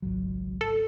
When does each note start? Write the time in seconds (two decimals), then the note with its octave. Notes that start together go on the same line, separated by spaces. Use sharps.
0.02 G#1 C#2 F#3
0.61 A4